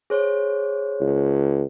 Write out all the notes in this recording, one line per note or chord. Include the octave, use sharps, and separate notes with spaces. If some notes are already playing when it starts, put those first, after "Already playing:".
G#4 C5 C#5
C#2